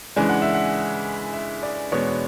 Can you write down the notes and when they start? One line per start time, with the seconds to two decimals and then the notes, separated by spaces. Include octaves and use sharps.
0.16 C#3 E3 G#3 D4 G#5
0.29 F#5
0.42 E5
0.54 F#5
1.33 E5
1.63 D5
1.92 E2 B2 G#3 B3 D4 C#5